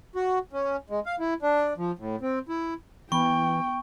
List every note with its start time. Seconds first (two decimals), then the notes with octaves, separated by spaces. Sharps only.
0.15 F#4
0.53 C#4
0.90 G#3
1.06 F5
1.20 E4
1.42 D4
1.77 F3
1.99 A2
2.21 C4
2.49 E4
3.12 E3 B3 G5 B5 C#6